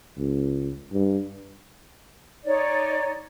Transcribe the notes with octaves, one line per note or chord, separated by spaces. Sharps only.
C#2
G2
D#4 C#5 D5